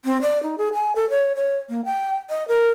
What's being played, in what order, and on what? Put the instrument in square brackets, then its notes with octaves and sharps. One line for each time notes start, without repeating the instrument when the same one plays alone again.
[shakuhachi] C4
D5
D#4
G#4
G#5
A4
C#5
C#5
A#3
G5
D#5
A#4